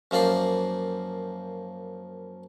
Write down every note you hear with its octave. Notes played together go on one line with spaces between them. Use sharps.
F#2 F3 A#3 D5 C6